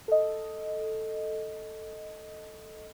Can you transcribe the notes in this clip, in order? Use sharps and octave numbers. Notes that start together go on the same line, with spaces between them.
A4 D#5